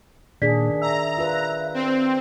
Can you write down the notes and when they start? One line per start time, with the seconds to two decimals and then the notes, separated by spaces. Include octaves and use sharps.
0.42 A#2 D#3 D4 G#4 D5 B6
0.82 E5 A#5
1.18 F4 B4
1.74 C4